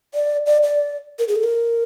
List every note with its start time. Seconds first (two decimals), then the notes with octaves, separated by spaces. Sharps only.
0.14 D5
0.46 D5
0.63 D5
1.19 A#4
1.28 G#4
1.36 A4
1.44 A#4